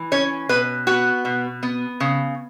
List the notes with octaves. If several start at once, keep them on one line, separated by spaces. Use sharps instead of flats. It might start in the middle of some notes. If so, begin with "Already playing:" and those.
Already playing: E3
C#4 C#5
B2 B4
B3 F#4
B2
B3
C#3